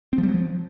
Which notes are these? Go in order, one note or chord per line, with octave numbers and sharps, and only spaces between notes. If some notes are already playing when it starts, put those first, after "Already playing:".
C4
F3
G3
F#3
F3